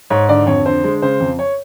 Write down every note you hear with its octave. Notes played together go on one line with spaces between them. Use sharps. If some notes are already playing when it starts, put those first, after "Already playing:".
G#2 C#5
D3 D5
F2 C#5
D3 C5
G#3
C#3 C5
F2
C#5